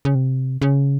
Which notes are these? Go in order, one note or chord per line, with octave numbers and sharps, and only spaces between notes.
C#3
C3
C#3